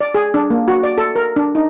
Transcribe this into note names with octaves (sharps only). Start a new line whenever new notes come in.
D5
G#4
D4
A#3
F#4
D5
A4
A#4
D4
D#4